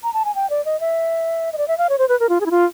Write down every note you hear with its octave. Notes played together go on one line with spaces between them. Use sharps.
A#5
A5
G#5
G5
D5
D#5
E5
D#5
D5
E5
F5
C#5
C5
B4
A#4
F4
G#4
E4
F4